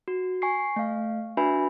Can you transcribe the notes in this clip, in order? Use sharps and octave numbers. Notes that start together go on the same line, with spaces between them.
F#4
G#5 C#6 C7
A3 F5
D4 F#4 B4 E5 G#5 B5